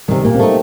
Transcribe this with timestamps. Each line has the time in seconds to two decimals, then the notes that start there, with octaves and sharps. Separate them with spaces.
0.08 C3 D#3 G3
0.25 A#2 A#3
0.35 C4
0.39 A3 D#4